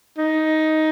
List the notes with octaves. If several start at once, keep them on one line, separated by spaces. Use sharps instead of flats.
D#4